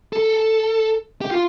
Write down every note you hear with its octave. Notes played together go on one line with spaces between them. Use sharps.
A4
G4
F4